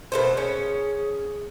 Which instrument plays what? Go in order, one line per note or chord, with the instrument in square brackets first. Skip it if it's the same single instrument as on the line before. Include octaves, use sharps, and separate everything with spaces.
[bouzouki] B2 A3 C5 [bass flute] A#4
[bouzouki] C#4 [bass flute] G#4